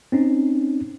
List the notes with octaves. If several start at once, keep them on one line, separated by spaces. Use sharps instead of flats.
C4 C#4 D#4